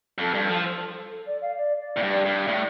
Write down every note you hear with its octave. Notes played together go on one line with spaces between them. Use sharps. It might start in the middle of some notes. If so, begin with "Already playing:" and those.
F2 A4
G2
A4
F3
C5
A4
A4
D5
F5
D5
D5
A2
G2 D5
G2
A2